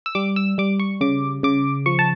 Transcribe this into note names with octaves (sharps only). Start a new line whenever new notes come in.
E6
G3 D6
E6
G3 D6
C#6
C#3 D6
C#3 D6
F3 C#6
A5